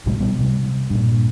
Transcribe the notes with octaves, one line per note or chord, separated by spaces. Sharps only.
C2 A2 F#3 G#3
B2 G3 B3
C3 G3
G2 A#2